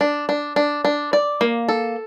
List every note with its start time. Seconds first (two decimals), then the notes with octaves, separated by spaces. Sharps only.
0.01 D4
0.29 D4
0.56 D4
0.85 D4
1.13 D5
1.41 A#3
1.69 A4